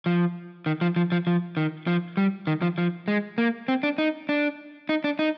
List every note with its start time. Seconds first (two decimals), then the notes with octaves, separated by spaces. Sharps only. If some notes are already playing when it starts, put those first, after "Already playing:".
0.06 F3
0.66 D#3
0.81 F3
0.96 F3
1.12 F3
1.27 F3
1.57 D#3
1.87 F3
2.17 G3
2.47 D#3
2.62 F3
2.78 F3
3.08 G#3
3.38 A#3
3.68 C4
3.83 D4
3.98 D#4
4.29 D4
4.89 D#4
5.04 D4
5.19 D#4